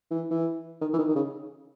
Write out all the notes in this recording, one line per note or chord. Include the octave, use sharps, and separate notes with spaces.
E3
E3
D#3
E3
D#3
D#3
C#3